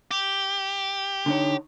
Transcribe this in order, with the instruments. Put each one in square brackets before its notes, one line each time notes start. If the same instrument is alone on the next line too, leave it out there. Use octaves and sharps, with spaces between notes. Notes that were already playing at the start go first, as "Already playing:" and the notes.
[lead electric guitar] G4
[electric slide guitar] D3 D#4 C#5